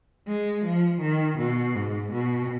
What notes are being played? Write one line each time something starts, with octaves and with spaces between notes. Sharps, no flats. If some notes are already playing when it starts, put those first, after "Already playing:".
G#3
F3
D#3
B2
G#2
B2